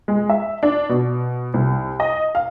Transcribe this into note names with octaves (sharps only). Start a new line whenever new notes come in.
G#3
E5
D4
B2
C2
D#5
F5